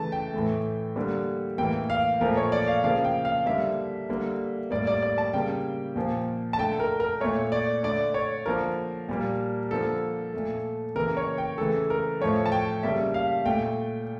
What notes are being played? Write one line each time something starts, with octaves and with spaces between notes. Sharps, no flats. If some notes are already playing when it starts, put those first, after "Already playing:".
Already playing: C#3 E3 A3 A5
G5
A2 E3 A3
D3 G3 A#3
A2 E3 A#3 G5
F5
A#2 F3 A3 A#4
C#5
D5
F5
C#3 F3 A#3 F5
G5
F5
D3 G3 A#3 E5
D3 G3 A#3
A2 G3 A#3 D5
D5
D5
A5
C#3 G3 A#3 G5
A#2 F3 A#3
A5
D3 A3 G5
A#4
A#4
A#2 A3 C#5
D5
D3 A3 D5
C#5
D3 F3 A#3 A#4
A#2 G3 A#3
D3 F3 A#3 A4
A#2 A3
C#3 E3 A#3 A#4
C#5
G5
C#3 E3 A3 A4
A#4
A2 F3 A3 C#5
A5
G5
C#3 G3 A#3 E5
F5
A#2 A3 G5